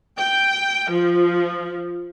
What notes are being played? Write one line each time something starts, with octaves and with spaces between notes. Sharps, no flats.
G5
F3